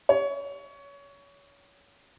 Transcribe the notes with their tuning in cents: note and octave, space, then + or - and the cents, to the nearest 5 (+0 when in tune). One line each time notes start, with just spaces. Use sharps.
C#5 +25